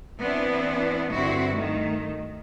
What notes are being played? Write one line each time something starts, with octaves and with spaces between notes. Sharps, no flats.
E3 B3 C4 D4 E4
G2 D3 C4 E4 F#4
D#3 A3